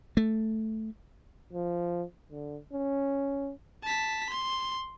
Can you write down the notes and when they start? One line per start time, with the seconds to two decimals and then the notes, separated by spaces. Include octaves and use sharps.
0.17 A3
1.53 F3
2.31 D3
2.73 C#4
3.83 A5 B6
4.29 C6